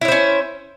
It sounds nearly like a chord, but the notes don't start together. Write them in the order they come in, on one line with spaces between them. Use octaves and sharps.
E4 C#5 C5 C#4